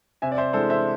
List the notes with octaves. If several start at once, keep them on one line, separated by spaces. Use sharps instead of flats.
C3 E5 G#5
D5
C5 E5
E3 G#3 D4 A4 C5
C5 E5